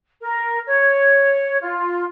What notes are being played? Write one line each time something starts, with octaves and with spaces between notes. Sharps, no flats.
A#4
C#5
F4